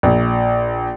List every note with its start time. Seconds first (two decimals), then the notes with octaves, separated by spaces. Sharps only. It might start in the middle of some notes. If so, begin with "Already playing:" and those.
0.03 A#1